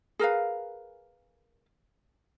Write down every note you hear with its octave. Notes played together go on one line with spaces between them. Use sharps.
G#4 A#4 B4 F5